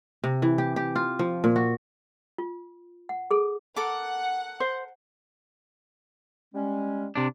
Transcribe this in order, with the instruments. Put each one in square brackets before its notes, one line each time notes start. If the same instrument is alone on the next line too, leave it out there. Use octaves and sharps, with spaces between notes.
[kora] C3
E3
G4
G4
F4
F3
A#2
F#4
[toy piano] F4
F#5
G#4 A4
[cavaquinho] A4 A#4 D6 [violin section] F#5
[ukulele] C5
[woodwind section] G3 G#3 C#4
[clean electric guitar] C3 D4